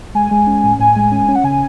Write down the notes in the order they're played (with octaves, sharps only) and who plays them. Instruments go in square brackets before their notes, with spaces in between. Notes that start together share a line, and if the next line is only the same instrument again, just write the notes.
[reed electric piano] G#3 [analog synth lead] G#5
[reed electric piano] G#3
C#4
A2
[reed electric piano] A2 [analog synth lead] G#5
[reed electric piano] G#3
C#4
C#4
[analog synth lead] F#5
[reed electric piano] C#3 [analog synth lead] G#5